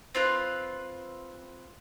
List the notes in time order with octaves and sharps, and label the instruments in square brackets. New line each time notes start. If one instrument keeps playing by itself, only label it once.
[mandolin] C4 F4 B4